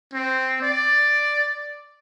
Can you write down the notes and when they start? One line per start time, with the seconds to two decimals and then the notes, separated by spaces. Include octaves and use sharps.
0.13 C4
0.62 D5